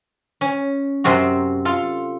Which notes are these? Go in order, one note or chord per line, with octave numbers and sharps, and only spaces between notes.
C#4
F#2 C3 C4 F#4
F4 A4